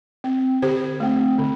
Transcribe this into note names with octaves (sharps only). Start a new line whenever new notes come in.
C4
D3 G4 C5
A3 C4
D3